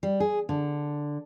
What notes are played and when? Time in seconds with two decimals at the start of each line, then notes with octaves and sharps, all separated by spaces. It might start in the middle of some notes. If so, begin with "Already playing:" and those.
0.03 G3
0.20 G#4
0.49 D3